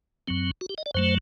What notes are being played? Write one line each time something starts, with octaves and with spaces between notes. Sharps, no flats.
F#2 F#3 C4
F#4
G4
D#5
D5
F#2 F#3 A3 C5